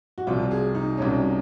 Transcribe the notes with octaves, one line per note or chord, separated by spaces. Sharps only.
F#4
C2 C3 F#3 F4
G#4
D#4
C2 C3 F#3 C#4